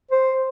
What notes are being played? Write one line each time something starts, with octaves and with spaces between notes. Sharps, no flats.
C5